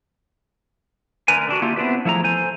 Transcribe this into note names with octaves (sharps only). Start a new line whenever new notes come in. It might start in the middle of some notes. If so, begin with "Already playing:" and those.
D3 A3 A#4 B4 G#5
D3 D4 F#4
A3 A#3 E4 F4 G4
B3 C4 D4 E4 B4 E5
F3 A3 E4 G#4 A#5
A4 C5 G#5